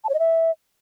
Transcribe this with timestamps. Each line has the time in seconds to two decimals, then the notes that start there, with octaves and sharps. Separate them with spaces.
0.04 A5
0.09 C#5
0.14 D#5
0.19 E5